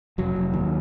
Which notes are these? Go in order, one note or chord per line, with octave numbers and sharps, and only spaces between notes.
F1 F#3
F1
D#2